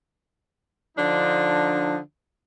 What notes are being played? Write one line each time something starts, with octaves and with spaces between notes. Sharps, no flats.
D3 F3 D4 D#4